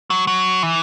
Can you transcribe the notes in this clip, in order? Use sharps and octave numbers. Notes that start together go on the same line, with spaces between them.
F#3
F#3
E3